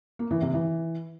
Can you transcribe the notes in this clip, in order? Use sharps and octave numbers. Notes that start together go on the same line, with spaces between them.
A#3
E3
C3
E3